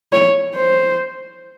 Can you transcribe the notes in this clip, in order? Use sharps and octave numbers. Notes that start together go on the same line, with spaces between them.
C#5
C5